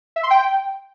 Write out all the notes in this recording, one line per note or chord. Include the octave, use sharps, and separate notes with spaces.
E5
C6
G5